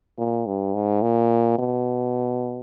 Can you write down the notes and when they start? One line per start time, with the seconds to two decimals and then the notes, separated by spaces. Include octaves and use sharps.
0.18 A#2
0.47 G2
0.74 G#2
1.02 A#2
1.59 B2